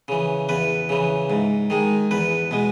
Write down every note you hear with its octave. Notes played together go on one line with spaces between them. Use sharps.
C#3 E3
E2 B4
C#3 E3
G#2
D#3 G#3
E2 B4
B2 G#3